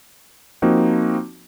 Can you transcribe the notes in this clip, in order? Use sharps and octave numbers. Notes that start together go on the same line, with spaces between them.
F3 A#3 C4 D#4 F#4